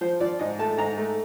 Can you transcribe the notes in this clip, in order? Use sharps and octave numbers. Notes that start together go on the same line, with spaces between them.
F3 C5
F3 D5
G#2 D#5
A3 A5
G#2 A#5
A3